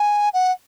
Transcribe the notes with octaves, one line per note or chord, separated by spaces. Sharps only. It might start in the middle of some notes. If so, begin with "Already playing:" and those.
Already playing: G#5
F#5